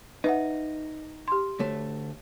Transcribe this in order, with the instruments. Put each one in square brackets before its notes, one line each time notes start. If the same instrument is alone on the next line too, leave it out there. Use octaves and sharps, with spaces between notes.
[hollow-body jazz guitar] D#4 [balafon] B4 E5 F#5
[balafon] G4 C6
[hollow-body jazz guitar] D2 A3 [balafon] C#5